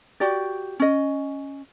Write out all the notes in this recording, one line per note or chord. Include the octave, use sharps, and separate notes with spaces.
F#4 G4 D5
C#4 D#5